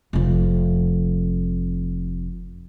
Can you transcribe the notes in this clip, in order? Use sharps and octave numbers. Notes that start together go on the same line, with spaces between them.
F1 F2